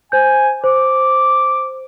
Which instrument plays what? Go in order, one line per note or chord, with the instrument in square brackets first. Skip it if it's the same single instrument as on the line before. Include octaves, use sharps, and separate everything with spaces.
[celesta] C5 G6 [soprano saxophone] G#5
[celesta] C5 [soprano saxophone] D6